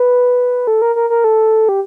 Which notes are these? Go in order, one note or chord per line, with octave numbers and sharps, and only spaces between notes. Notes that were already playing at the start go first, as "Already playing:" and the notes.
Already playing: B4
A4
A#4
A#4
A#4
A4
G4